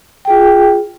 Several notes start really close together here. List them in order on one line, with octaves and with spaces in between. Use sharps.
G5 G#4 F4